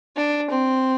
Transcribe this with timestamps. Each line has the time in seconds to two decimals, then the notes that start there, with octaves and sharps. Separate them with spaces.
0.16 D4
0.50 C4